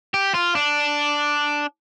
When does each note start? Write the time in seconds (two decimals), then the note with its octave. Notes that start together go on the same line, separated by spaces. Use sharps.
0.14 G4
0.34 F4
0.55 D4